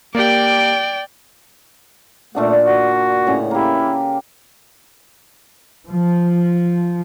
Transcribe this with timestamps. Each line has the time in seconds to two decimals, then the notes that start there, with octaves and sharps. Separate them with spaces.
0.15 A#3 G4 D5 G5
2.35 A#2 A3 D4 F#5
2.64 F#4
3.27 A2 C#3 F#5
3.51 A#3 E4 G4
5.88 F3